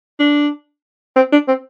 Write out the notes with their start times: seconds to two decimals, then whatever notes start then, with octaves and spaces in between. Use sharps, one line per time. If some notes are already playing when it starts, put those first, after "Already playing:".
0.19 D4
1.16 C4
1.32 D4
1.48 C4